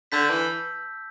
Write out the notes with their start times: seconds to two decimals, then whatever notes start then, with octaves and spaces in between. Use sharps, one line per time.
0.12 D3 A5 E6 G6 B6
0.30 E3